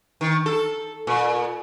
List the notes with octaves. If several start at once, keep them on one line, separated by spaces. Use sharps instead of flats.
D#3
A4
A#2